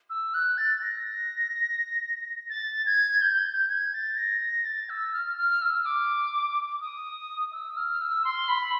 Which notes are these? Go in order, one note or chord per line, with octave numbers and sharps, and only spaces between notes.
E6
F#6
A6
A#6
A6
G#6
G6
G6
G#6
A6
A#6
A#6
A6
E6
F6
F6
E6
D6
D#6
E6
F6
E6
C6
B5